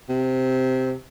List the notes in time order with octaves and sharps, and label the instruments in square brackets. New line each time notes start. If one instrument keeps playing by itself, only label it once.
[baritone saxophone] C3